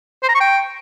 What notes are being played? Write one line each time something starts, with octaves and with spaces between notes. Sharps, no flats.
C5
A#5
C#6
G5